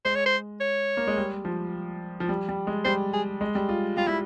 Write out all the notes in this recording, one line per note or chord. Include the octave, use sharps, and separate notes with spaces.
G#3 C5
C#5
C5
C#5
A#3
G#3
G3
F3
F3
G3
G3
G#3
G3 C5
G#4
G#3
G3
F4
G3 F4
G3 E4